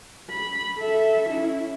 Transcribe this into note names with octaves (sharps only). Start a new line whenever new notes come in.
B5
A4 E5
C#4 E4